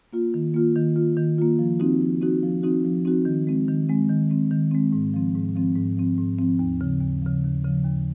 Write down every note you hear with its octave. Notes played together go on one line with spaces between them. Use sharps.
A#3 F4
D#3
A#3 F4
D#3
A#3 F4
D#3
A#3 F4
F3
C4 D#4 F#4
F3
C4 D#4 F#4
F3
C4 D#4 F#4
F3
C4 D#4 F#4
D#3
G#3 C4
D#3
G#3 C4
D#3
G#3 C4
D#3
G#3 C4
G#2
F3 C4
G#2
F3 C4
G#2
F3 C4
G#2
F3 C4
D#2
C#3 F3
D#2
C#3 F3
D#2
C#3 F3
D#2